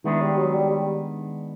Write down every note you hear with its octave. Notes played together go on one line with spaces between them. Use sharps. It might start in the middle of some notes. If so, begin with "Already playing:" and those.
D#3 E3 G#3 B3 D4
G3
F#3
G3
G3